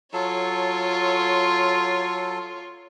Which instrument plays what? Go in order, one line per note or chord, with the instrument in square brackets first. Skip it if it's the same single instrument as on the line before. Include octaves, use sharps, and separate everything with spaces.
[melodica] F#3 A4 [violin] F4 C#5